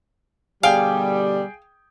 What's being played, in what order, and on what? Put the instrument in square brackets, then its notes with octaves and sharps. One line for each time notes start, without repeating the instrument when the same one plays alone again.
[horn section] B2 D3 G3 [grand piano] G#4 G5 [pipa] F5